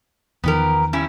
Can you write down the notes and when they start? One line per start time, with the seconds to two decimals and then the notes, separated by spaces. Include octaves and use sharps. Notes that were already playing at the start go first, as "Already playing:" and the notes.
0.44 E2 D#3 F3 B3 G4 A#4
0.93 G3 C#4 E4